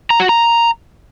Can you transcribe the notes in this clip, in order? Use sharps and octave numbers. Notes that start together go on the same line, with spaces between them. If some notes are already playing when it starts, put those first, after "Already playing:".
A#5
F#4
A#5